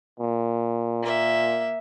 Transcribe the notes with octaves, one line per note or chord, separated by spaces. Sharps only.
A#2
A#3 E5